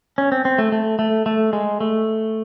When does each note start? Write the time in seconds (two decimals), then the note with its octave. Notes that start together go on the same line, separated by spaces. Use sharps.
0.18 C#4
0.32 C4
0.45 C4
0.58 A3
0.72 A3
0.99 A3
1.26 A3
1.53 G#3
1.80 A3